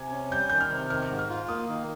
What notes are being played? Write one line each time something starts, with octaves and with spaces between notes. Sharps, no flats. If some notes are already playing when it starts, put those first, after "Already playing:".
Already playing: C3 G#5
C#4
G3 G6
D#3 G6
F6
C3
D#3 F6
G#2
F6
F4
A#3 D#6
D#3